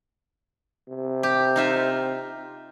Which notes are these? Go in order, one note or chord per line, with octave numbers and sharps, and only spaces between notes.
C3
G4
D#4 F4 E5